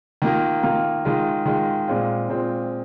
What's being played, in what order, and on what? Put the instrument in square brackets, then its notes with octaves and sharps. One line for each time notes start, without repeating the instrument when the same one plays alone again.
[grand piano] D#3 A#3 F4
D#3 A#3 F4
D#3 G#3 F4
D#3 G#3 F4
A#2 G#3 C4 F4
A#2 G#3 C4 F4